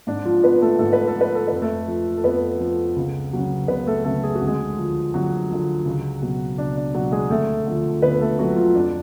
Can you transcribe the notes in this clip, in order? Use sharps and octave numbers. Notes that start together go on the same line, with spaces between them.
G#2 D4
F3 F4
F3 B3 B4
A3 A4
G#2 A4
B4
A4
F3
B4
A4
F2 B4
A3 A4
F3
A4
F2 B3 B4
F3
C#2
C#3 F#3
C#2 B3 B4
A3 A4
C#3 F#3 A3 A4
G#4
F#4
D2
G#3 G#4
D3 F3
D2 F#3 F#4
D3 F3
C#2
B2 F#3
C#2 D4
D4
B2 F#3 F#4
G#3 G#4
D2 A3 A4
D3 F3
D2 B3 B4
A3 A4
D3 F3 F#3 F#4
F3 F4
F2 D4